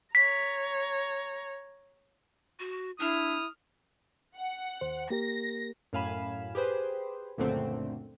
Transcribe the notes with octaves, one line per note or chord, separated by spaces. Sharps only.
C#5 A#5 B6
F#4
D4 E4 D#6 F6
F#5
D#2 C5
A#3 G4 A#4 A#6
F#2 A2 F5 G#5 B5 E7
G4 G#4 B4 C5
C#2 F#2 A#2 D3 A3 C4